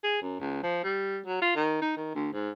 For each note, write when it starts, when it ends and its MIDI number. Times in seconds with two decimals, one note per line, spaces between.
0.03 0.21 68
0.22 0.36 42
0.40 0.62 37
0.63 0.83 53
0.84 1.18 55
1.26 1.41 54
1.42 1.52 65
1.56 1.79 51
1.82 1.93 63
1.97 2.10 51
2.15 2.28 38
2.33 2.50 44